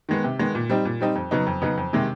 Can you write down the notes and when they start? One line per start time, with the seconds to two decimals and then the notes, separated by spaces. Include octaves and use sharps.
0.09 D#3 G#3 B3
0.24 C3
0.39 D#3 G#3 B3
0.55 A#2
0.70 G3 C4 D#4
0.85 A#2
1.01 G3 C4 D#4
1.15 F2
1.31 C#3 F#3 B3 D#4
1.47 F2
1.62 C#3 F#3 B3 D#4
1.77 F2
1.93 C3 D#3 G#3